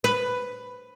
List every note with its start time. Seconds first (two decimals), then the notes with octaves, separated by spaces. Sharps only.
0.04 B4